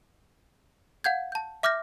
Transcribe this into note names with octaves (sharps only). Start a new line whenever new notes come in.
F5 F#5 G6 G#6
A5 G6
E5 D6 F6 G6 A#6